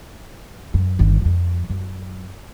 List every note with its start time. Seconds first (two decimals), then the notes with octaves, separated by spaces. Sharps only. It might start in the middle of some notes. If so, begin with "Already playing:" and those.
0.74 F#2
0.99 G1 D#3
1.21 F2 F3
1.70 F#2